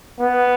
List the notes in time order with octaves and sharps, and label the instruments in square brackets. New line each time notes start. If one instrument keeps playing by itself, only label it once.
[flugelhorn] B3